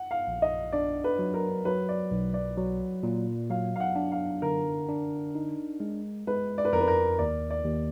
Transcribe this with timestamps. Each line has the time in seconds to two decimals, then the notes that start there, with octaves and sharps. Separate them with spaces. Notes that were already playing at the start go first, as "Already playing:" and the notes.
Already playing: F#5
0.11 F5
0.27 A#1
0.42 D#5
0.72 D4 D5
1.04 B4
1.19 F#3
1.34 A#4
1.65 F#3 B4
1.89 D5
2.11 B1
2.34 D5
2.57 F#3
3.03 A#2
3.50 F#3 F5
3.76 F5
3.80 F#5
3.96 D4
4.12 F5
4.42 D3 A#4
4.89 D4
5.35 D#4
5.80 G#3
6.27 G#3 B4
6.58 D5
6.65 B4
6.73 F2 A#4
6.81 B4
6.88 A#4
7.19 D#2 D5
7.50 D5
7.65 D#2